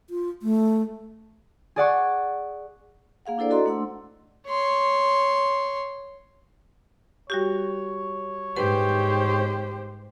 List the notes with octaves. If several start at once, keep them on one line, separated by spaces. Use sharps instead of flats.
F4
A3
G#4 D5 F#5 C#6
A#3 G#4 F5 F#5
D4 E4 A4 C5 D5
F#4 A4 D#5 A#5 C6
A3 D4 F#5 C6 E6
C#5 C6
G3 F#4 G4 C#5
G#2 G4 B4 C5